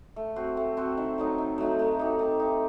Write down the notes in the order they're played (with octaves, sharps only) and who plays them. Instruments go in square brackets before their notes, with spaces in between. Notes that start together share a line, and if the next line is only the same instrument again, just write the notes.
[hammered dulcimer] A3
C4 F#4 C5
A3
C4 F#4 C5
D#3
F#3 A3 D#4
D#3
F#3 A3 D#4
A3
D#4 G4
A3
D#4 G4